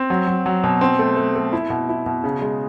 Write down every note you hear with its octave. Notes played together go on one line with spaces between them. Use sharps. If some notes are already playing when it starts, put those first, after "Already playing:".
Already playing: C4
F#3
F#3
F#3
B2
C4
A3
A3
A3
E4
B2
E4
B2
C#3
G#3